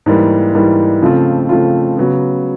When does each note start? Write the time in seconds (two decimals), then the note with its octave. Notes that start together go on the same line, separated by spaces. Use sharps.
0.06 G#2 E3 G3 A#3
0.55 G#2 E3 G3 A#3
1.02 C#3 F3 A3 C4 F4
1.49 C#3 F3 A3 C4 F4
1.97 C#3 F#3 B3